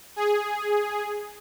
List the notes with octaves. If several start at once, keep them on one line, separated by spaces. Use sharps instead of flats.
G#4